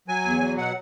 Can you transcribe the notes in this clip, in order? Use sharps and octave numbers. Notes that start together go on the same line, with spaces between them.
F#3 G#5
E2
F#3
B2 F#5